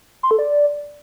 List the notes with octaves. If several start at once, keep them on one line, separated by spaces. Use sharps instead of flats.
C6
A4
D5